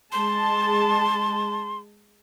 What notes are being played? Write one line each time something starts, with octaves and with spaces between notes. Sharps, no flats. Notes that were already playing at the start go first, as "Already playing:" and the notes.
G#3 A5 C6